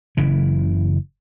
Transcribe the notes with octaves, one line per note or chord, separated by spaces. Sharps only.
F#1 C#3 E3